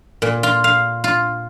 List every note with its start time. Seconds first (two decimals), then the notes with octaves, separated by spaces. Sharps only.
0.22 A#2
0.43 F4
0.64 F5
1.04 F4